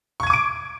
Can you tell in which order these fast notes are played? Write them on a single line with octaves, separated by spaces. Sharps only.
C#6 G#6 D#7 D6 D7